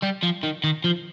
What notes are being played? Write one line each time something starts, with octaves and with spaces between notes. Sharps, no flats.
G3
F3
D#3
D#3
F3